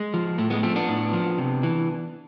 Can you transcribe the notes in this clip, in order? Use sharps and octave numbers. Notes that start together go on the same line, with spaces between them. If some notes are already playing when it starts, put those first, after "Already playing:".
Already playing: G#3
F3
A2 A3
G#3 B3
F3 A3 C4
B3 D4
A2
F3
C3
E3